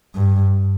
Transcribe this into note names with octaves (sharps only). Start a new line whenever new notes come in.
G2